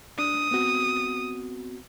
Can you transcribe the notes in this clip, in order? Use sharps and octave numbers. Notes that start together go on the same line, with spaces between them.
D4 D#6
B3 C4 F#4